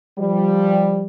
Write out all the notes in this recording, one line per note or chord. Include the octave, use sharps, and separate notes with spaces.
F3 G3